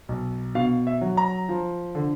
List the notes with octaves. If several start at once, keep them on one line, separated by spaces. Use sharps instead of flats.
B1
B2 F5
E5
F#3
A#5
F3
D3